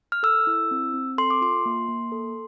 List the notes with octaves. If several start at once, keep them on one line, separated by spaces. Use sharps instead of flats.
F6
A4 E6
E4
C4
C4
A4 C6
D6
F4 C6
A#3
A#3
A4